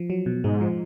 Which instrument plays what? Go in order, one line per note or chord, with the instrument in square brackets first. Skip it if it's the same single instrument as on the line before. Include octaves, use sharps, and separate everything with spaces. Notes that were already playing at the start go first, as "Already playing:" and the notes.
Already playing: [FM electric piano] F3
F#3
B2
[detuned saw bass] G#2 [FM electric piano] G#3
[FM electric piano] F3